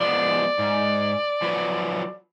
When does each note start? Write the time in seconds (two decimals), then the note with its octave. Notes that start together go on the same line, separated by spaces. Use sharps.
0.01 F3 G#3 B3 D5
0.59 G#2
1.42 F3 F#3 B4